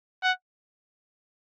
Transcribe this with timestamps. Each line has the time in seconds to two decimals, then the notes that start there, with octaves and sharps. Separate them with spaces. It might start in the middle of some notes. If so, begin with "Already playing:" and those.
0.23 F#5